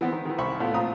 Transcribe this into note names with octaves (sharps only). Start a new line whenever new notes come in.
E3 B3 C4
D#3
D#3 E3
C2 C5 B5 C#6
A2 B3 F4
A#1 C4 F4 A#5 D#6